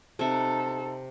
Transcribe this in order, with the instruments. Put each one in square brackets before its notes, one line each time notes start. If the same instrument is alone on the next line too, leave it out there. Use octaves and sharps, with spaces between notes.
[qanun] C3 E5 F#5 [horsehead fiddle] D#4 A4